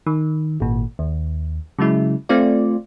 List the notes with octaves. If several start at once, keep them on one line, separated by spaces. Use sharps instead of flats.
D#3
G#1 A#2
D#2
C#3 F#3 G#3 E4
A3 C4 F4 D5